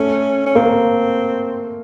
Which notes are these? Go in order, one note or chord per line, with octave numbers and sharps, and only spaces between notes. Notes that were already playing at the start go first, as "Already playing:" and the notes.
Already playing: A3 C#4
C#4
A#3 C4